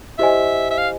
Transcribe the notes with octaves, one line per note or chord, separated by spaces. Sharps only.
E4 G4 C5 D#5 E5 G#5
E5
F5